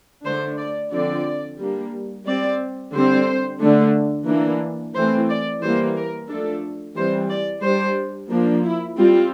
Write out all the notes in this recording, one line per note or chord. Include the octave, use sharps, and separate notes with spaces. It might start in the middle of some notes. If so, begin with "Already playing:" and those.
D3 A3 D4 C5
D5
D3 F3 C4 D5
G3 A#3 D4
G3 C4 D5
D3 G3 C4 C5
D3 A3 D4
E3 A#3 D4
E3 A3 C4 C5
D5
E3 G3 A#3 C5
A#4
F3 A3 D4 A4
E3 G3 C4 C5
D5
G3 D4 C5
F3 A#3 D4
E4
G3 C4 F4